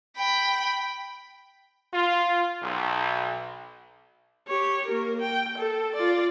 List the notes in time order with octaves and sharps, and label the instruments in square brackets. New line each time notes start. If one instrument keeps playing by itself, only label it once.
[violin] G5 B5
[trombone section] F4
B1
[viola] G4 C#5
A#3 A#4
G5
A4
F4 D5